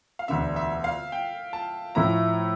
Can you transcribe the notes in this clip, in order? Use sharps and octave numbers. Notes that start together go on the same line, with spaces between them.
F5
E1 D2 D3 E5
E5
F5
G5
A5
A2 F3 A3 E4 A#5